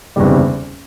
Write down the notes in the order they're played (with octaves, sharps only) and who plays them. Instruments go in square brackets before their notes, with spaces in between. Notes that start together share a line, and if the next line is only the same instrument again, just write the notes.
[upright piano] F#1 E2 C3 D#3 G3